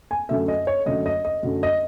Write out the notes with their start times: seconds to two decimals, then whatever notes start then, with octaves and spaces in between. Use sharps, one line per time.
0.11 G#5
0.29 F#2 D3 F#3 A3 E5
0.48 D#5
0.67 C#5
0.86 F#2 D3 F#3 A3 D#5
1.06 D#5
1.25 D#5
1.43 F#2 D3 F#3 A3
1.63 D#5